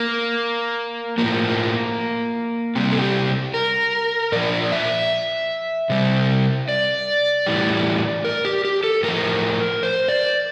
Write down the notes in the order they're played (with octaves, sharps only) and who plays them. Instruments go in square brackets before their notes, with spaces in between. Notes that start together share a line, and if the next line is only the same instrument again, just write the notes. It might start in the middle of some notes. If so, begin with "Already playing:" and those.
Already playing: [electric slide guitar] A#3
A2 F3 A#3
C3 G3 C4
A4
G4
A#4
A#2 F3 D5
E5
C3 G3
D5
A2 E3 G3
A#4
G4
G4
A4
A2 F3 A#4
C5
D5